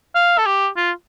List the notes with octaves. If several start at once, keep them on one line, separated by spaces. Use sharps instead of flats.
F5
A4
G4
F4